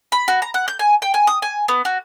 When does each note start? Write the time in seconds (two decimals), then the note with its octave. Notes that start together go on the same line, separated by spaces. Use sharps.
0.12 B5
0.28 F#4
0.42 A#5
0.54 F#5
0.68 G6
0.79 G#5
1.02 G5
1.14 G#5
1.27 D#6
1.42 G#5
1.68 B3
1.85 F#4